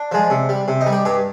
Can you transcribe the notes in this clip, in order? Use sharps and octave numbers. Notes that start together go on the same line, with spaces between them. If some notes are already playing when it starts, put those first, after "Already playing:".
Already playing: D4
F3 G#3
C3
G3
C3
D#4
G3
G4
G2 G4